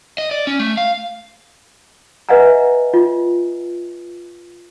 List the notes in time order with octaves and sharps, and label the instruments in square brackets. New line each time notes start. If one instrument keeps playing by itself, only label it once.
[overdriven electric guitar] D#5
D5
C#4
A3
F5
[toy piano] B4 D#5 E5 F#5 G#5 A#5
F4